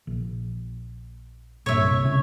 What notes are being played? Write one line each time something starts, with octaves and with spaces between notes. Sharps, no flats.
A#1
C2 G2 A#2 C#5 E5
C2 C#3